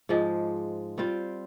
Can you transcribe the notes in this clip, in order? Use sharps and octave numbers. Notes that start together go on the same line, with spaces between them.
G#2 F3 G#3
G3 C4 F4 C5